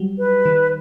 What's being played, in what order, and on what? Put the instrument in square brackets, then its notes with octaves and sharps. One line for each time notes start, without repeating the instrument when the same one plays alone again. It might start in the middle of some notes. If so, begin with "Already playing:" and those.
Already playing: [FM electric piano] F#3 G3
[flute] B4
[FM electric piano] D#3